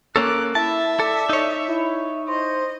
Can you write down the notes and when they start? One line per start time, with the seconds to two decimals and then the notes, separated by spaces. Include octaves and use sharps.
0.16 A#3 C#4 A4 D6 F#6
0.55 E4 E5 A5
1.00 A4 D5
1.30 D#4 C#5
1.68 E4
2.28 C5 D#5